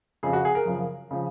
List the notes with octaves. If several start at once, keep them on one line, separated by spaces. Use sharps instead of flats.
F2 C#3 F3 G#4
F#4
G#4
A#4
F#2 C#3 F3
C#3 F3